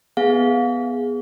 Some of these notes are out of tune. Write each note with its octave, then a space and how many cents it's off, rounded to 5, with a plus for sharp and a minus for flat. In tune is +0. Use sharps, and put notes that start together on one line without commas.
B3 +0 G#4 +0 F5 +30